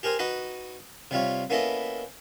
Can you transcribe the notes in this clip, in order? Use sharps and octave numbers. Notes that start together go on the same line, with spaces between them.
G4 G#4 A#4 C5 G#5
D#4 F#4 B4 D#5
C3 G3 F4 C#5
A#3 B3 C#4 E4 A4 D#5